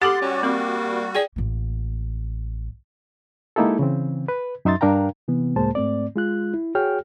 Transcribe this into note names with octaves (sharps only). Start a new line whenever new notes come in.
G4 A4 F#5 C6 D6 A6
G3 C#4 F#4
A#3 C4
G#4 D5 G5
A1 A#3
G#3 A#3 D#4 E4 G4 A4
C#3 E3 C4
B4
F#2 D#4 E5 C6 A6
G2 D4 A#4 F5 G5 A#5
C3 E3 B3
C#2 A2 G#3 A#3 C5 A5
G#2 A3 C4 D5
G#3 F4 F#6
E4
F#4 G#4 C#5 G5 F6